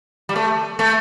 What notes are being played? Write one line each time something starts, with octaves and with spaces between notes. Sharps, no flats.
G3
A3
A3